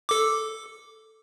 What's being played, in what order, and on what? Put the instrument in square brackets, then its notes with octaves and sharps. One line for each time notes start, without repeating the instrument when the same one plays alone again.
[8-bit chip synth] A4 D6